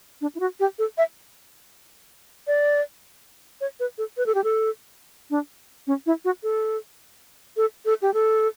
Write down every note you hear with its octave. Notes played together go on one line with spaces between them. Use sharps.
D4
E4
F#4
G4
A4
E5
D5
C#5
B4
A4
B4
A4
G4
A4
D4
C#4
E4
F#4
A4
A4
A4
G4
A4